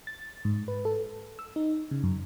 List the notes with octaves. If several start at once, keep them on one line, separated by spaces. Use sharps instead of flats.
A6
G#2
B4
A4
E6
D#4
C#3
F#2